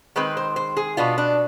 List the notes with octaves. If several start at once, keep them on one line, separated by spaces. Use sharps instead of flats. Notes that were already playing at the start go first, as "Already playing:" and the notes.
D#3 G#3 C4 B4
C5
C5
G#4
B2 B3 D4 F4
D4